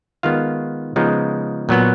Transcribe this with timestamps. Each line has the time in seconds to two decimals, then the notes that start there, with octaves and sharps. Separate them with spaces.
0.23 D#3 G#3 B3 F4 F5
0.96 C#3 F3 G#3 B3 D#4
1.69 A#2 F#3 B3